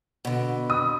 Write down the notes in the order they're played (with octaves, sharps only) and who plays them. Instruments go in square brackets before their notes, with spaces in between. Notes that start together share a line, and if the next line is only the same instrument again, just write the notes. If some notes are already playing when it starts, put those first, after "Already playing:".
[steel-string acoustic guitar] B2 D3
[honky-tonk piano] D#6